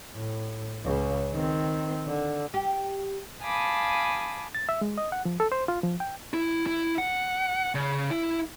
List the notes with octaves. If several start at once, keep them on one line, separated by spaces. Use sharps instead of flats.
A2
C#2 C#3
D#3 C4
D3
G4
F5 G#5 A5 B5 D6 D#6
A6
E5
G#3
D#5
F#5
F3
A4
C5
F4
F3
G5
E4
E4
F#5
C#3
E4